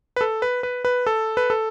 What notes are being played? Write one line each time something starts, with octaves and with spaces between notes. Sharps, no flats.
B4
A4
B4
B4
B4
A4
B4
A4